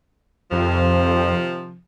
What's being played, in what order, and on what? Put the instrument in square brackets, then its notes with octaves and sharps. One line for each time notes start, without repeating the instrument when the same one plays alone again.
[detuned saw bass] F2 [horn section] C3 D#3 F3